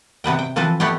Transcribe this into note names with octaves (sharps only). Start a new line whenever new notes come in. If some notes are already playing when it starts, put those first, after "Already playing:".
C3 B3 B4 G5
G5
E3 F3 C4 A4 B4
A3 B3 G4 C#5 G5